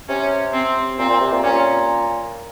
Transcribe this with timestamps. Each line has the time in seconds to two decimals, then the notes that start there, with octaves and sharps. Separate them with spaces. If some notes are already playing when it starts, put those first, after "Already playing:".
0.09 C3 C#4
0.54 C4
0.98 A#2 C4
1.09 A#2
1.21 C3
1.33 A#2
1.43 A#2 C#4